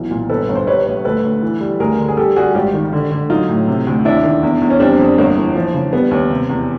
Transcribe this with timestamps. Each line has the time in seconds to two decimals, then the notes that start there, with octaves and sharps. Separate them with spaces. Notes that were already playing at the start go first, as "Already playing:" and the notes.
Already playing: B1 E3
0.11 A#2
0.30 G1 A4 B4
0.49 G1
0.55 C5
0.67 G3 B4 C#5
0.86 A#1
1.05 D2 A4 B4
1.24 D2
1.43 E3
1.61 G3
1.80 D2 G#4 A#4
1.99 D3
2.08 G#4
2.17 G3 G4 A4
2.36 G3 F#4 G#4
2.55 G#1 F4 G4
2.74 D#3
2.93 D3
3.11 D3
3.30 F#3 D#4 F4
3.49 A2
3.68 C3
3.87 D2
4.05 D#2 D4 E4
4.24 D#3
4.43 E2
4.62 E2
4.70 C#4
4.80 G3 C4 D4
4.99 F2
5.18 G1 A#3
5.37 E3
5.55 F3
5.74 C#3
5.93 G3 B3
6.11 D#2
6.31 C3
6.49 E2